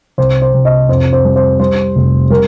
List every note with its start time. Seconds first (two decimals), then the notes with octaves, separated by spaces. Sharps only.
0.18 C2 C5
0.42 C5
0.54 C2
0.65 D#5
0.89 F2 C5
1.13 C5
1.25 G3
1.36 C5
1.59 G3 C5
1.95 F1
2.30 G3 A#4